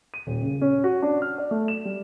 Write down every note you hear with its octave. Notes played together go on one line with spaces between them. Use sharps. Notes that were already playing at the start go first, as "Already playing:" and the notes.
D#7
D#1
C#3
C#4
F#4
D4
F6
D5
A3
E7
G3